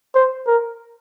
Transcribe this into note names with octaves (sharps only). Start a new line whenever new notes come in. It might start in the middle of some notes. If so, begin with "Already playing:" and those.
C5
A#4